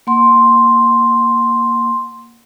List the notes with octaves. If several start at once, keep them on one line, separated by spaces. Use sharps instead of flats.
A#3 F#5 C6